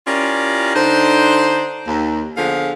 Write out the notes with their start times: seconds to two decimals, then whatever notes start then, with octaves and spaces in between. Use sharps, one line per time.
0.07 C#4 E4 F4 G4 A#4 D5
0.75 D3 D4 D#4 C5
1.87 D#2
2.37 D3 F3 B3 G#4 F5